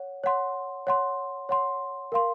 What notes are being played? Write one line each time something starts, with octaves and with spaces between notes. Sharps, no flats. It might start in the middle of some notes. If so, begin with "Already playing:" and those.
Already playing: C#5 F#5
C#5 F#5 C6
C#5 F#5 C6
C#5 F#5 C6
A#4 F5 C6